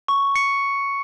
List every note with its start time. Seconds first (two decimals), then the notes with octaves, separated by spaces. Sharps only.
0.08 C#6
0.35 C#7